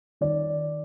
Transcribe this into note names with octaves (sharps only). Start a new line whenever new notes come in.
D#3 D5